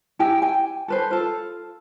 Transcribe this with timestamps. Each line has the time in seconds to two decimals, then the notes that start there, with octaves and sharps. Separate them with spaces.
0.19 E4 G4 G5 G#5
0.42 G5 G#5
0.88 A4 B4 C5
1.11 F4 A4